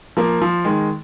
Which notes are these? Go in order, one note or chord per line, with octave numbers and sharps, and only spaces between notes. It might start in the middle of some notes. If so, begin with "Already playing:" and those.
F3 A#3
F3
D#3 G#3